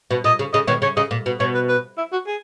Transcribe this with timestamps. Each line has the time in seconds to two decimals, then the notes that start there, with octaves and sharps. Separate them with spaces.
0.11 B2
0.24 A#2 D#5
0.39 C#3
0.53 C#3 D#5
0.67 B2 D#3 C#5
0.82 C#3 C#5
0.97 C#3 D#5
1.11 A#2
1.26 B2
1.40 B2 C#5
1.54 B4
1.68 B4
1.98 E4
2.12 F#4
2.27 G#4